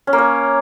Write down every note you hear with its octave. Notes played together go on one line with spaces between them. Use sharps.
C#4
A#3
C#5